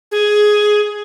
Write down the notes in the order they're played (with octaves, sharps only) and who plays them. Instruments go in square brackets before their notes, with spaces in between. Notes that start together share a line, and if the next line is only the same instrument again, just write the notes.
[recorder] G#4